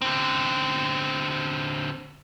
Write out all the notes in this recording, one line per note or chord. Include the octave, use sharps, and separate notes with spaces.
D3 C4